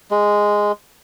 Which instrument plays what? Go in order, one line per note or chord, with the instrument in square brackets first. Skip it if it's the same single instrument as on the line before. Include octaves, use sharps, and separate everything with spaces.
[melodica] G#3